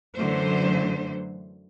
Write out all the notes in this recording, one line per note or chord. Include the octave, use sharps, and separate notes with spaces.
F#2 D3 E3 F#3 A3 C5